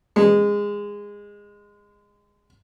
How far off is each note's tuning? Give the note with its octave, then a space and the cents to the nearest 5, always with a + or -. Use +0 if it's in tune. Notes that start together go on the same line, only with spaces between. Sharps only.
G#3 -20